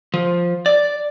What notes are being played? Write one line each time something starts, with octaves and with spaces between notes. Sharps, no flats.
F3
D5